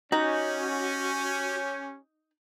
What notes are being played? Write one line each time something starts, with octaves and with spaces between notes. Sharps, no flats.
C#4 D#4 F#4 G4